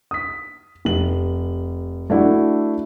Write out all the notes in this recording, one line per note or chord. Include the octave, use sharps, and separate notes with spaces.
D#6 B6
F1 F#7
A3 D4 E4 F#4